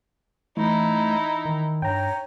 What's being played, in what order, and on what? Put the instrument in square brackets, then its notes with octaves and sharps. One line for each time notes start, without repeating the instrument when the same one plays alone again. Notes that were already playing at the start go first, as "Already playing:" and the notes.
[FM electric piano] E3 [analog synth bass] A3 [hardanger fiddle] D#4 E4
[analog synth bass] D#3
[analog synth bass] G2 [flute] C#5 [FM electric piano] G5 A#5